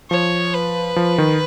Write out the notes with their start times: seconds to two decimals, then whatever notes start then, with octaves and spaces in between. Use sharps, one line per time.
0.11 F3 C#5
0.54 B4
0.96 F3
1.18 D#3